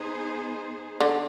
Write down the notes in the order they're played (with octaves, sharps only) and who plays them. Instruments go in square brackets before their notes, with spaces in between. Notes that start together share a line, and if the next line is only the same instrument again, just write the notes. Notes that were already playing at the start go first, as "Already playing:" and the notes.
Already playing: [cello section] B3 D#4 G#4 C5
[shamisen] D3